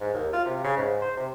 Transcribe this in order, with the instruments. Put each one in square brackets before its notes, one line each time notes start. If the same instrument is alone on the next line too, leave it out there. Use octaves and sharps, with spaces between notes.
[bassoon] G#2
D#2
F4
C3
C#3
G#2
C5
C3